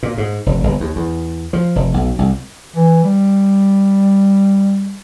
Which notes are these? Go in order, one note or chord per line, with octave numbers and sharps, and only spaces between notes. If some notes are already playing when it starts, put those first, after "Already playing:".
A#2
G#2
F1
G1
D#2
E2
F3
F1
B1
C2
E3
G3